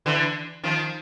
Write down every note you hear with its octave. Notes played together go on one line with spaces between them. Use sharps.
D3 E3
D#3 F3